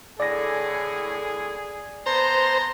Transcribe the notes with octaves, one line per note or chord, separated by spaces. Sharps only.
A2 D3 G#4 D5 A#6
B3 C5 A5 A#5